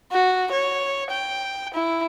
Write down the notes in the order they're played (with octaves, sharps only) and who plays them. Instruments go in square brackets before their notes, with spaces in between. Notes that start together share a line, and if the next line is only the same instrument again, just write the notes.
[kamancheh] F#4
C#5
G5
E4